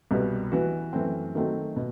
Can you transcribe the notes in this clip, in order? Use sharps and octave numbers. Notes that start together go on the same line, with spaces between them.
C2 B2 G3 B3
E3 B3 F#4
F#2 E3 A3 C4
D#3 F#3 A3 C4 F#4
B2